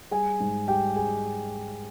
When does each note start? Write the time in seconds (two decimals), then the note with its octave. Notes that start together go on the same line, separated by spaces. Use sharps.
0.11 G3 G#4 G#5
0.40 G#2
0.68 G3 G4 G5
0.96 G#4 G#5